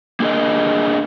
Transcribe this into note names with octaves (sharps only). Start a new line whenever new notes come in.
A#3 D4 G#4 A#4 D#5